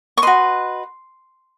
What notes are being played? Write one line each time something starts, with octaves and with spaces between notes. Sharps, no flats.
C#6
F#4 B4 D#5 C6